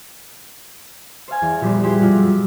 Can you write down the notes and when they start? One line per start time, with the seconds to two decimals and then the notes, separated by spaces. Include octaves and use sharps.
1.28 C5 C#5 F5 G#5
1.41 E2 A#6
1.61 A#2 F3 G3 B3 F#4 C5
1.83 E4 G4 G#4 C5 F#5 G5
2.00 F2 B2 F4 D5 A#5 F6
2.17 G2 F#3